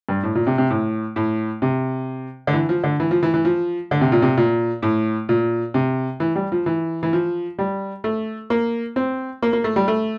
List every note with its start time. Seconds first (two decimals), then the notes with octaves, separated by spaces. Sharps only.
0.09 G2
0.23 A2
0.35 A#2
0.47 C3
0.58 C3
0.70 A2
1.16 A2
1.62 C3
2.47 D3
2.53 E3
2.69 F3
2.84 D3
3.00 E3
3.11 F3
3.23 E3
3.34 E3
3.45 F3
3.91 D3
4.01 C3
4.12 A#2
4.22 C3
4.37 A#2
4.83 A2
5.29 A#2
5.74 C3
6.20 E3
6.36 G3
6.52 F3
6.66 E3
7.03 E3
7.13 F3
7.59 G3
8.04 A3
8.50 A#3
8.96 C4
9.43 A#3
9.53 A#3
9.64 A3
9.76 G3
9.88 A3